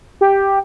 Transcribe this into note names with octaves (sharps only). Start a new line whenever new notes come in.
G4